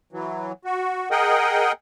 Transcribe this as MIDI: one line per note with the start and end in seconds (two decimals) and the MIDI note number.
0.12 0.52 52
0.12 0.52 54
0.65 1.09 66
1.11 1.72 68
1.11 1.72 70
1.11 1.72 75
1.11 1.72 78
1.11 1.72 79